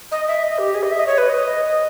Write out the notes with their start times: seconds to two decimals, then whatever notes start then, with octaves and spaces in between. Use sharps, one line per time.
0.12 D#5
0.28 E5
0.43 D#5
0.59 G4
0.75 G#4
0.83 D#5
0.92 E5
0.99 D#5
1.07 C#5
1.18 B4
1.29 D#5